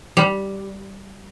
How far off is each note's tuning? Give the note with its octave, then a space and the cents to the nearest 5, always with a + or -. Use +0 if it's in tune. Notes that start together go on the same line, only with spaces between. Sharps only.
G3 -5